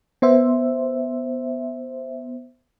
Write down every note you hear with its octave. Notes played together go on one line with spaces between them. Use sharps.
B3 C5 E5